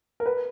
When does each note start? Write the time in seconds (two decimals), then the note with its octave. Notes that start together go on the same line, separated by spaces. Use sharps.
0.20 A#4
0.26 B4